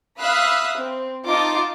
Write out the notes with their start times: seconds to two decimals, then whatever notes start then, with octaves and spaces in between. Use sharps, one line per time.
0.20 E5 F5 B5 D#6 E6 F#6
0.77 C4
1.27 D#4 F4 A5 D6